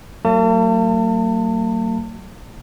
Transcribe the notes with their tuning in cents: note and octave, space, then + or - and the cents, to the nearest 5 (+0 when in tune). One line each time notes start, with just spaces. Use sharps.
F#3 +20 A#3 -45 A5 +35